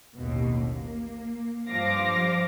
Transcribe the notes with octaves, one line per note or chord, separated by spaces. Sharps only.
A1 D#2 B2
A#3
G2 F3 C5 F5 D6 A#6